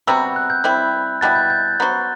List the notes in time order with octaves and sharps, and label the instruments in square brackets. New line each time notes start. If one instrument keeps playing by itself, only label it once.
[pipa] C3 G3 B3 F#4 [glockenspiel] E6
[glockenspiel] F#6
G6
[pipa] G3 C4 E4
[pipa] B2 G3 B3 E4 [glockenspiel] F#6 A6
[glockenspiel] G6
G6
[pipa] F#3 B3 F#4 C5